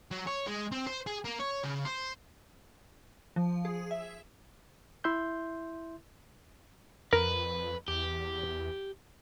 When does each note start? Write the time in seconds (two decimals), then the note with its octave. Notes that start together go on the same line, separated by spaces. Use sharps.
0.11 F#3
0.27 C#5
0.47 G#3
0.72 C4
0.87 C5
1.07 G#4
1.25 A#3
1.40 C#5
1.64 C#3
1.85 C5
3.36 F3
3.65 G#4
3.91 E5
5.04 E4 E5 C6 G6
7.13 F2 A#4 B4
7.88 E2 G4